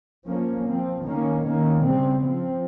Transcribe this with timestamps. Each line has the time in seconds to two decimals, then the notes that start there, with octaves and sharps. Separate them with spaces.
0.25 F3 A#3 C#4
0.65 F3 C4
1.03 D#3 A#3 C#4
1.42 D#3 A#3 C#4
1.81 C#3 G3 C4
2.20 F3 C4